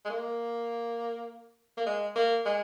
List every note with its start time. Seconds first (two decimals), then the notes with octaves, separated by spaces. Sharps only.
0.05 G#3
0.10 A#3
1.77 A#3
1.86 G#3
2.15 A#3
2.45 G#3